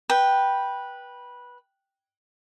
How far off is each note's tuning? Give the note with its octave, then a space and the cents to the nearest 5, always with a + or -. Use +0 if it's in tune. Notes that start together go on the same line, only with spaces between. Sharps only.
B4 -15 G5 +0